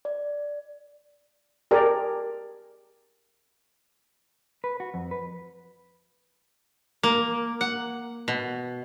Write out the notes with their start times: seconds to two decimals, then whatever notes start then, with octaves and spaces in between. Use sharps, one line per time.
0.05 D5
1.71 G4 G#4 A#4 D5
4.64 B4
4.80 F#4
4.94 F2
5.11 B4
7.03 A#3
7.61 F#5
8.28 B2